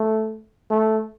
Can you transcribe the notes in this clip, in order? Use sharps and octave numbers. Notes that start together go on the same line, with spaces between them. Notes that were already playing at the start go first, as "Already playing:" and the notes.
Already playing: A3
A3